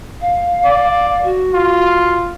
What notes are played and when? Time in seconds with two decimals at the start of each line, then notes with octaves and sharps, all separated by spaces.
0.20 F5
0.65 D5
1.23 F#4
1.54 F4